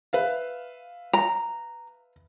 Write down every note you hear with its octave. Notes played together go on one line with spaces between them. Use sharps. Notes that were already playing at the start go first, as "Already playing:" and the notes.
B4 E5 F5
A#5